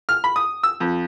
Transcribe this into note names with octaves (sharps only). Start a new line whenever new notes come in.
F6
B5
D#6
E6
F2